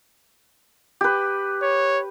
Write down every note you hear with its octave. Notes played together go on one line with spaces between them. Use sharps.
G4 B4
C#5